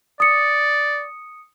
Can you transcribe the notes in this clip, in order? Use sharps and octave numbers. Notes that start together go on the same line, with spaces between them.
D5 D#6 C#7